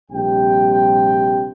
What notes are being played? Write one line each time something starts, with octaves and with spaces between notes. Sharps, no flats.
A#1 C3 G3 G5